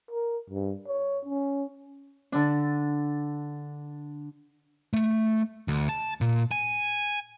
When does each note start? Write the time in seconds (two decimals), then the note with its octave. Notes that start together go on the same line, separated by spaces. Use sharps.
0.11 A#4
0.50 G2
0.87 C#5
1.25 C#4
2.32 D3 D4
4.93 A3
5.68 D2
5.89 A5
6.21 A#2
6.51 G#5